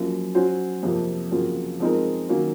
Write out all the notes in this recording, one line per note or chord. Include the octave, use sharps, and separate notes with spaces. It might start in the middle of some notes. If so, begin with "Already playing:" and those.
Already playing: F#2 F3 A#3
F#3 C#4 F#4 C5
F2 C3 F3 A#3
F2 C#3 F#3 A#3 F4
F3 G#3 C4 D#4 A#4
D#3 F#3 A#3 C#4